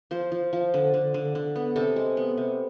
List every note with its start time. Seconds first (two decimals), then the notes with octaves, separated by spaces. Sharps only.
0.11 F3 C5
0.32 F3
0.53 F3
0.74 D3
0.94 D3
1.14 D3
1.35 D3
1.56 B3
1.76 C3 A4
1.96 G#3
2.17 B3
2.37 C3